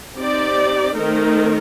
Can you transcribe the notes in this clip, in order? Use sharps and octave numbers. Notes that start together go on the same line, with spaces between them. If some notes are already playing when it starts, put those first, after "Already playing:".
C4 D#4 G4 D5
D#3 A3 C4 D#4 A#4